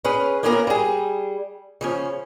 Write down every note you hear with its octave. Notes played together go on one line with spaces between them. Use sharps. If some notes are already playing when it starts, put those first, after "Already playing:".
C#4 G#4 B4
A#3 B3 C#4 F4 G4 A#4
G3 G#4
C#3 F3 C#4